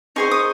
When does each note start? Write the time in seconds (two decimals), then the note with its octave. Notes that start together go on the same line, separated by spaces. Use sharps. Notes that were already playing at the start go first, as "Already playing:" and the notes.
0.16 D#4 G#4 C5 C#6
0.31 D#6